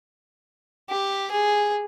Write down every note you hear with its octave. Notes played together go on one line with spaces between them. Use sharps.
G4
G#4